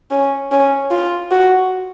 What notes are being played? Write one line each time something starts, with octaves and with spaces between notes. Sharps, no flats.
C#4
C#4
F4
F#4